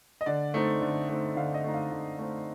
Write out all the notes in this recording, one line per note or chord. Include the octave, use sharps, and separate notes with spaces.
D#5
D3 D5
A3 C4 D#4
D3
A3 C4 D#4
D3 F5
D#5
A3 C4 D#4
F5
D3
A3 C4 D#4